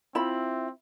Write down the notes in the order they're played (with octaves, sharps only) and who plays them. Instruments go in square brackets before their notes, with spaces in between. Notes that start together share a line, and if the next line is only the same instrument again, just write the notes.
[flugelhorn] C4 [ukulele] E4 F4 B5